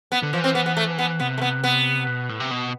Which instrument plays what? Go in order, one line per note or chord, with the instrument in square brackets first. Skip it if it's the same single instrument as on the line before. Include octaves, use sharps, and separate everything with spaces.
[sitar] B3
[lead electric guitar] D3
[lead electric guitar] E3 [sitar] F3
[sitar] C4
B3
B3
A3
B3
[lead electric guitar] C3 [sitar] B3
[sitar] A3
B3
B3
[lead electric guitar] B2
A2
C3
B2